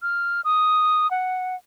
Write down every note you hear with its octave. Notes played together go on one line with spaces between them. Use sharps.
F6
D#6
F#5